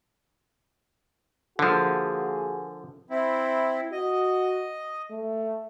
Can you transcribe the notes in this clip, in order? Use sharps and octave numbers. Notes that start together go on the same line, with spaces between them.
D3 F3 A#3 F#4 G#4
C4 E4
F#4 D#5
A3